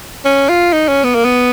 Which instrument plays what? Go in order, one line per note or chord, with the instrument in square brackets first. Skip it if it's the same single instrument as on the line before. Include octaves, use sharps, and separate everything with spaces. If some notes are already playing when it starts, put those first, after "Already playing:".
[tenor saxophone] C#4
F4
D#4
C#4
B3
A#3
B3